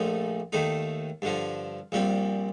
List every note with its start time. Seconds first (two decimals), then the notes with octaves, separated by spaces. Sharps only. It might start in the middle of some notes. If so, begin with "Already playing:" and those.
Already playing: A#1 A#2 F3 A3 D#4
0.52 D#2 D#3 A3 D#4
1.22 G2 D3 F3
1.92 A#1 A#2 G3 C4